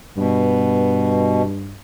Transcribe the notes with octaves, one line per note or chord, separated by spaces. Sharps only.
G2 B2